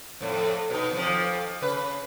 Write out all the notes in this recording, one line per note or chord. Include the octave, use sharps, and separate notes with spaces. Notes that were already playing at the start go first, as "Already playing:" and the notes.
F2 A2
B2 D#4
F2 F3
C#3 B4